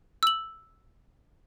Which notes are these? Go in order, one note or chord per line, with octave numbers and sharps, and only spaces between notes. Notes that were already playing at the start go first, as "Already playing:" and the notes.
E6 F#7